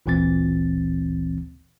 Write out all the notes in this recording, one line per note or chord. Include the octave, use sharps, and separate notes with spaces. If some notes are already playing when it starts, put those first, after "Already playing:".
G1 D2 A#2 E3 C4 A6